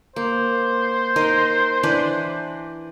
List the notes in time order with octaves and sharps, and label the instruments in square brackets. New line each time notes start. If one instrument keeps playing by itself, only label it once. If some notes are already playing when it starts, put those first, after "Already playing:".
[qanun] A#3 [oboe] C5
[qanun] D#4 A#4 D#5
E3 D4 B4